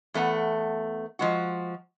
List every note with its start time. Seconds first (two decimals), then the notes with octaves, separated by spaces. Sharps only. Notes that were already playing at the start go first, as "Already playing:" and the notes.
0.14 E2 A3 B3 F#5
1.19 F3 G#3 F#4